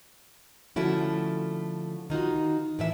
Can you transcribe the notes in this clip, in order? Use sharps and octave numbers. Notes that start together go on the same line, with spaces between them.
D3 F3 A3 C#4 E4 F#4
D#3 D#4 F4 F#4
A2 E3 E5